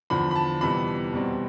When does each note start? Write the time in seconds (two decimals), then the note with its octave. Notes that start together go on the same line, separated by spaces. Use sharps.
0.10 E2 D3 F3 B5
0.31 B5
0.35 A5
0.61 F2 C3 E3 G3 B3 B5
1.12 E2 B2 G3 C4